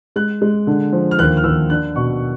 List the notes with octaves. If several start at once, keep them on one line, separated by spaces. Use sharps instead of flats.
G#3 F#6
G#3
D3
F3
F6
D#2 F#6
F6
D#2 E6
D4 F#6
B2 C#6